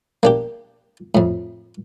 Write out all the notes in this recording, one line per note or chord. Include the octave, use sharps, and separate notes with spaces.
A#3 D4 G4
F2 A2